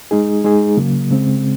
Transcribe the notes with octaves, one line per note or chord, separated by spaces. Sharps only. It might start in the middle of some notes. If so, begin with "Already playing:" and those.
G#3 D#4 G#4
G#3 D#4 G#4
C#3 F#3 A#3
C#3 G#3 C4